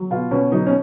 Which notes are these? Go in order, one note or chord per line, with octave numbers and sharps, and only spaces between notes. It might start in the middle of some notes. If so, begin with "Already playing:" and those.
Already playing: F#3
B2 F4
B2 C#4
F#3 D#4
C#4